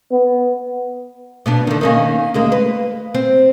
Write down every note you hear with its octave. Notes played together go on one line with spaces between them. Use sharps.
B3
B2 B3 D4
D3 D#3
D#3 A#3 C#4
D2 G#3 A#3
B4
C4